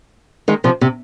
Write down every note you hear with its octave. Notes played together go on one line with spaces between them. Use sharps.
D#3 G#3
C3 F3
C3